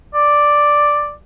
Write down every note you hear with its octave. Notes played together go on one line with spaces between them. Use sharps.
D5